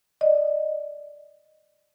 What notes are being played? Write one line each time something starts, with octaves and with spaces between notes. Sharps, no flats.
D5 D#5